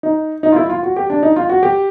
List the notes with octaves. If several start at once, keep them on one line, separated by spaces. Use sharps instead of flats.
D#4
D#4
F4
E4
F4
F#4
G4
D4
D#4
F4
F#4
G4